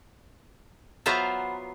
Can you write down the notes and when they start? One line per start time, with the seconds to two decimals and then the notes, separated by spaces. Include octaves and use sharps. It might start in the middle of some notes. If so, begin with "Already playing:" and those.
1.06 F#3 B3 F4 C5 E5 A#5